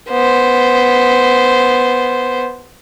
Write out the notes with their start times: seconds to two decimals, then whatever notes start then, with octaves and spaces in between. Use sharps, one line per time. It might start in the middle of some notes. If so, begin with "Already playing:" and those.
0.11 B3 C5